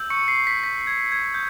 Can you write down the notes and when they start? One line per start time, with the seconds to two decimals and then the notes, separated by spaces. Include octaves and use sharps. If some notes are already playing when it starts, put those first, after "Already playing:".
Already playing: E6 G6
0.10 C#6 C#7
0.28 C7
0.47 B6
0.64 B6
0.87 G#6
1.12 G#6
1.34 D#6 G6